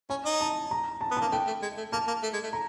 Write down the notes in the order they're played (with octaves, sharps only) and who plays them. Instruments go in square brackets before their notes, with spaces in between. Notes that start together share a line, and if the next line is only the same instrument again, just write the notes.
[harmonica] C#4 [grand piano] G#5
[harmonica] D#4
[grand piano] A5
A#5
A5
[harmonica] B3
[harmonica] A#3 [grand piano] A5
[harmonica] A3 [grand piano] G5
[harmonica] A3
G#3
A3
[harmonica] A#3 [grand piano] A5
[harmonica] A#3
A3
G#3
A3
[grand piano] A#5